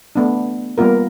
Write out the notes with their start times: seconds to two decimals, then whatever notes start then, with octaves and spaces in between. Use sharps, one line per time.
0.15 A3 B3 D4
0.78 G3 A#3 B3 F4 A#4